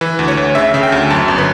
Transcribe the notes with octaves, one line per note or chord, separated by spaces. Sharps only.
E3 B4
D2
C#5
D2
C#3 E5
C#3
G5
D2
F#2 A5
G1
B4